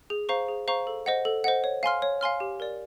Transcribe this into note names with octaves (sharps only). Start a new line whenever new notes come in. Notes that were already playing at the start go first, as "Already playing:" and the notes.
G#4
C5 F5 A#5 C#6
G#4
C5 F5 A#5 C#6
A4
C5 D#5 F#5
A4
C5 D#5 F#5
C#5
F5 G#5 C6 F6
C#5
F5 G#5 C6 F6
G4
A#4 D5